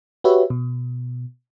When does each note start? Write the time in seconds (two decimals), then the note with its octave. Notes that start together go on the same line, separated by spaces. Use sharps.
0.24 F#4 G4 B4 C#5 E5
0.50 B2